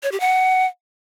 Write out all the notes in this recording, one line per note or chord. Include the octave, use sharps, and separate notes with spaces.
C#5
G4
F#5